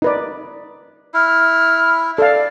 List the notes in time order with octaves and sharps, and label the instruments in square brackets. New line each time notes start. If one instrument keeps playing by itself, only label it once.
[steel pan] D#4 B4 D5
[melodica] E4 [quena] F6
[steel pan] A4 F5 [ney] D5